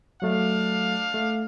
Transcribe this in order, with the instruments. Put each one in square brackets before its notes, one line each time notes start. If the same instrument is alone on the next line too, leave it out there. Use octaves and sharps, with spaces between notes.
[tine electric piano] F#3 A3 [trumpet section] D4 F5
[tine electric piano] A3